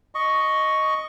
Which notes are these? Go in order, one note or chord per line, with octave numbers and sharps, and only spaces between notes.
D#5 C#6